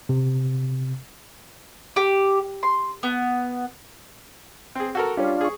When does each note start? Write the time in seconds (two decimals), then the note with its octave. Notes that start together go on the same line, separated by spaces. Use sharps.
0.09 C3
1.96 G4
2.63 C6
3.03 B3
4.75 C4 G#4
4.95 F#4 A4 A#4
5.17 G3 C#4 D4 F4
5.41 G#4 C#6